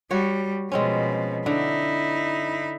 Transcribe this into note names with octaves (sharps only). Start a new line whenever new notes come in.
G3 F#4 C#5
B2 F3 G#3 C4 C#4
D3 D#4 E4